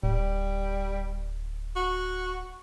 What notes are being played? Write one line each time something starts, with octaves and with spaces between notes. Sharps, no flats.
D1 G3
F#4